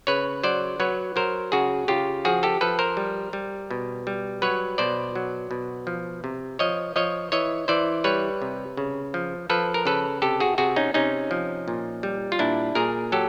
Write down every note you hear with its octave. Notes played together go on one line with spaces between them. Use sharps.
C#3 B4 C#5
F#3 C5 D5
F#3 B4 C#5
F#3 A#4 C5
C#3 F#4 G#4
C#3 F4 G4
F3 F#4 G#4
G4 A4
F3 A4 B4
A#4 C5
G3
G3
B2
G3
F#3 B4 C#5
B2 C5 D5
F#3
B2
F3
C3
F3 C#5 D#5
F3 C#5 D#5
E3 C#5 D#5
E3 C5 D5
G3 B4 C#5
C3
C#3
F3
F3 A4 B4
A#4
C#3 A4 B4
C3 G4 A4
F#4 G#4
C3 F#4 G#4
C#4 D#4
C3 C#4 D#4
F3
A#2
G3
F4
A#2 D4 E4
A#2 G#4 A#4
F#3 G4 A4